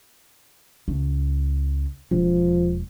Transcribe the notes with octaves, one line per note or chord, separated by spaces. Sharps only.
C#2
E1 F3